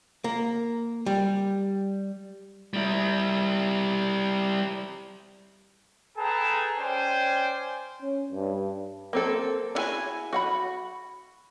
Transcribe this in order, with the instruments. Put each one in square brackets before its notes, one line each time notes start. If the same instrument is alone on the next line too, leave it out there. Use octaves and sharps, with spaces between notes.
[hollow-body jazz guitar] A#3
G3
[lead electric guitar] G3 E4
[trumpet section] G#4 A4 B4 G5 A5 A#5
C#4 C5 D5 G5 G#5
[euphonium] C#4
G2
[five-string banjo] A#3 C4 A4
D4 E4 F#4 G#4 G#5
F#4 F#5 B5